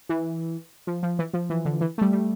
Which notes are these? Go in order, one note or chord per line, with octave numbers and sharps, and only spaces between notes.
E3
F3
F3
E3
F3
E3
D3
E3
A3
G3
G3